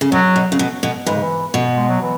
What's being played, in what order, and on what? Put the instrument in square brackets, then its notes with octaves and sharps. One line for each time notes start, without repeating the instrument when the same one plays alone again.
[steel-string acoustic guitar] C#3
[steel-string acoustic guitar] B2 [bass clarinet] F#3
[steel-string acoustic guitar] B2
C#3
B2
B2
[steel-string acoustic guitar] G#2 [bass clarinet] E3
[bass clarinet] C#3
E3
[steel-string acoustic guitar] B2
[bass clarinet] G#3
F#3
E3